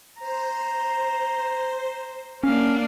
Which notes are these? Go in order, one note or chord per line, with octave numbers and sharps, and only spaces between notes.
C5 A#5
A#3 C#4 D4 F5